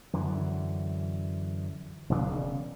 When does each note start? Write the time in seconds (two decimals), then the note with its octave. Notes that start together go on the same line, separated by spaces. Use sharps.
0.13 F#2 D3 E3
2.10 E1 C#3 D4